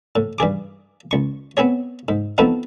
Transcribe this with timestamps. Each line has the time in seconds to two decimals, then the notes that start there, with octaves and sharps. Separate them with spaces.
0.16 A2
0.38 G2 E3 G#4 D6
1.11 C#2 C#6
1.57 B3 C4 G#4 C#5
2.08 G#2
2.38 F3 A3 B3 C4 D#4 E4